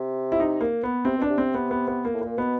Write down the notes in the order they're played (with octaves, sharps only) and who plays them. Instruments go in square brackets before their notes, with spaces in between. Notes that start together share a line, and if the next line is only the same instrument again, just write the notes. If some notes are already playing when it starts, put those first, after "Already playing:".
Already playing: [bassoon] C3
[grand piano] E4
D#4
A#3
B3
[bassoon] C3 [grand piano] C4
[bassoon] B2 [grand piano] D4
[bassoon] C3
[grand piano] C4
B3
B3
B3
A#3
[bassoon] A2
[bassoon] A#2 [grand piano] A#3
[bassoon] B2 [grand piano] B3